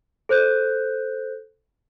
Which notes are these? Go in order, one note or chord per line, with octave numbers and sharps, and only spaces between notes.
A4 C5 F#6 G6